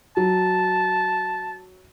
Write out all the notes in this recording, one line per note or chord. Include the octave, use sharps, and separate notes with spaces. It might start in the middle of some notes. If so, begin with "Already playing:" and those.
F#3 A5